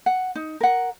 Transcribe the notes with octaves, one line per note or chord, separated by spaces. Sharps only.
F#5
D#4
A#4 F#5